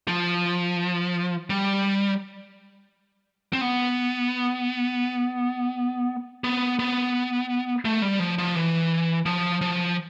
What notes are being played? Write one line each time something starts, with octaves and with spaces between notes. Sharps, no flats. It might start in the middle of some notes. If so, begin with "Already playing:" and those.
F3
G3
C4
B3
B3
B3
A3
G3
F3
F3
E3
F3
F3